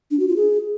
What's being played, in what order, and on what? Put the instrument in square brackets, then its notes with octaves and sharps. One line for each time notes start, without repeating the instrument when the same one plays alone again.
[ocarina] D4
F#4
F4
G#4